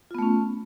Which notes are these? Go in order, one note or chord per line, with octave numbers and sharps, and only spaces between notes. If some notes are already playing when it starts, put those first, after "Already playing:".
A3 B3 C#4 F4